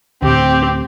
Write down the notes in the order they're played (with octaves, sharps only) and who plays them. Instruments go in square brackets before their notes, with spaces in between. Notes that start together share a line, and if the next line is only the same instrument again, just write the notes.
[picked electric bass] D2 A2 [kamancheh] C4 G4